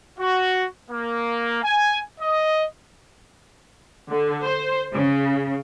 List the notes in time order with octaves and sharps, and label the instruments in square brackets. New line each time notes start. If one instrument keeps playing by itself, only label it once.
[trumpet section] F#4
A#3
G#5
D#5
[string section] D3
C5
C#3